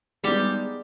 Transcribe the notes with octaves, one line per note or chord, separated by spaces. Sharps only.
G3 G#3 B3 D#4 G4